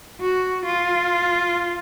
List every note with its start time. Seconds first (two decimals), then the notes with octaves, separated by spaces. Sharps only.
0.21 F#4
0.67 F4